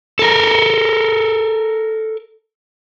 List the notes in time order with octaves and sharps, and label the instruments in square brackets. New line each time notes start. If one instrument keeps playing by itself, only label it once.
[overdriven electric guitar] A4 A#4